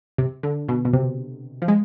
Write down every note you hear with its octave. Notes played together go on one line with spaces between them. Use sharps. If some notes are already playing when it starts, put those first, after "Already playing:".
C3
D3
B2
B2
C3
F3
G#3